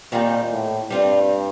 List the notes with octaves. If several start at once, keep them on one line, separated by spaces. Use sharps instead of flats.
A#2 D#3 G3 C4 D#4
A2
G2 G3 C4 F4